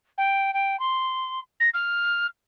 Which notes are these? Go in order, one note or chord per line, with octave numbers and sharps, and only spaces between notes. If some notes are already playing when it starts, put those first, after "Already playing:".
G5
G5
C6
A#6
F6